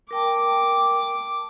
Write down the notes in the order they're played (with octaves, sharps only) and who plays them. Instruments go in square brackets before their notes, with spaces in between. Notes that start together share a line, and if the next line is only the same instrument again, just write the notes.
[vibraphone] A#4 G5 A5 [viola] D6